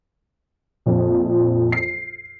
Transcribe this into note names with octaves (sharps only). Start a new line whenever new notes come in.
A#1 F2 F3
C7